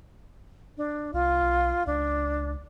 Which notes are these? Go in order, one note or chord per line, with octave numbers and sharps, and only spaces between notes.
D4
C2 F4
B1
C#2 D4